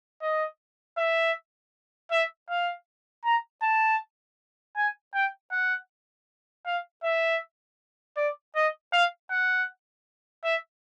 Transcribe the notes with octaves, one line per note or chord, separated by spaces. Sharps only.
D#5
E5
E5
F5
A#5
A5
G#5
G5
F#5
F5
E5
D5
D#5
F5
F#5
E5